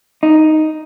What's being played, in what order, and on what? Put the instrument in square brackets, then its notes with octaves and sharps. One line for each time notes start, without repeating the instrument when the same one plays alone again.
[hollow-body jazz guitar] D#4